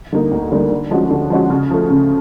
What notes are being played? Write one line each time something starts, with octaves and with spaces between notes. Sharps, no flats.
D3 G3 A#3 D#4
D2
D3 G3 A#3 D#4
D3
F3 G#3 C#4 F#4
D3
F3 G#3 C#4 F#4
C#3
F3 A3
C#3